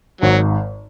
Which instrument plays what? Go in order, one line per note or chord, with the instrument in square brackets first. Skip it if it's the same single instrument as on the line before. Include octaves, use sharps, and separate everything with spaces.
[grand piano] G#1 G#2 [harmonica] F#3